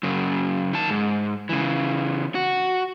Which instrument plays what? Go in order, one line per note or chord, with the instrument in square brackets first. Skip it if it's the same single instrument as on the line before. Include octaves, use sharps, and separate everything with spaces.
[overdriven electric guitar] F#2 C#3
D#3 A5
G#2
C#3 E3
F#4